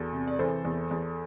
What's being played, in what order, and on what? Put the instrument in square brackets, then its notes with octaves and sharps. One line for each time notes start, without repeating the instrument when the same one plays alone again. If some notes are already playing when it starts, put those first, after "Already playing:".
Already playing: [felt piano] E2 F#4 A4
C3
D5
E3 A4 C5
E2
E2